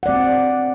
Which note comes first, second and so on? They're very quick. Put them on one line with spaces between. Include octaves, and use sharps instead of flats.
F#5 D5 C4